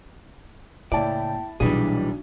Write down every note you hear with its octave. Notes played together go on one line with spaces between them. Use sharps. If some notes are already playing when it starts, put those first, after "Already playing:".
C#2 A2 A#3 E4 D5 G5 A5
B1 A#2 E3 G3 C#4 D4 G#4